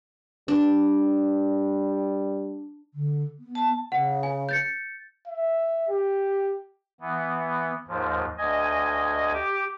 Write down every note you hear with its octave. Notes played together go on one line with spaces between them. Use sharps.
G3 D4
D3
B3
A5
C#3 F#5
G#5
G6 A6 C#7
E5
G4
E3 B3
D#2 G#2 F3
D2 D#5 G#5
G4 D6